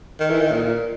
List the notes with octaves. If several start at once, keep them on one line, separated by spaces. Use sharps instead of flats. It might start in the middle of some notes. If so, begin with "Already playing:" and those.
D#3
E3
D#3
A#2